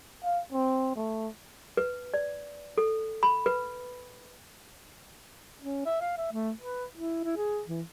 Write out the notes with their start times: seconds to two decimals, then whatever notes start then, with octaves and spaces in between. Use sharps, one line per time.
0.24 F5
0.53 C4
0.96 A3
1.77 B4
2.14 D5
2.78 A4
3.23 B5
3.46 B4
5.62 C#4
5.86 E5
6.01 F5
6.18 E5
6.32 A3
6.61 B4
6.97 E4
7.24 E4
7.36 G#4
7.68 E3